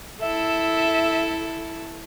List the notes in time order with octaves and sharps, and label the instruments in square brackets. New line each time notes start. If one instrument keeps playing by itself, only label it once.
[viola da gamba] E4 A4 [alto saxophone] E5